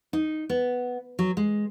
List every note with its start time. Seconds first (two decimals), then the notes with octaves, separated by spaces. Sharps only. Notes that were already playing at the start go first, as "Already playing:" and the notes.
0.13 D#4
0.50 B3
1.19 F#3
1.37 G#3